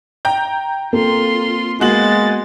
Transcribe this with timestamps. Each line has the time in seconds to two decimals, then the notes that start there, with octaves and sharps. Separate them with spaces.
0.25 G5 A#5 G6
0.93 A#3 C4 F4 A4 C6
1.81 G#3 A#3 B3 F#4 A6 F#7